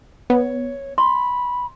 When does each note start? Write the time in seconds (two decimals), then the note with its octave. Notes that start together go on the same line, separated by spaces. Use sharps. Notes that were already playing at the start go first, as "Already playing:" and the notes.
0.30 B3 C#5
0.98 B5 C6